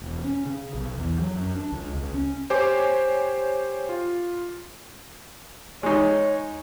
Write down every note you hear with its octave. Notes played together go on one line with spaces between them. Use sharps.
E1
C#4
C#3
B1
E2
F#3
F#2
D4
C#2
C#2
C#4
G4 C5 C#5 G#5 D6
F4
G#3 D#4 C#5